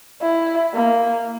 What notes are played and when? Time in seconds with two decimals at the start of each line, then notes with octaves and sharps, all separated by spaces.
0.22 E4
0.73 A#3